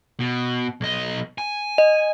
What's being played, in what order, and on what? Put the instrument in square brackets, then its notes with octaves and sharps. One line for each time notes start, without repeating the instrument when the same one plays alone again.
[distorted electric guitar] B2
B1 D#5
G#5
[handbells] D#5